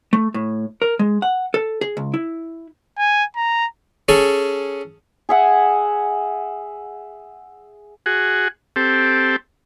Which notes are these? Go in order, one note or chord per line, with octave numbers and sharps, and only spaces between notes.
A3
A2
A#4
G#3
F#5
A4
G#4
C#2
E4
G#5
A#5
C#4 G#4 A4
G#4 E5 F#5 G#5
F#4 G#4
C4 G4 A4